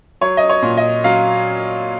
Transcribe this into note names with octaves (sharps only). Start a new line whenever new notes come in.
F#3 C#5
D#5
C#5
A#2
D#5
F#3 F5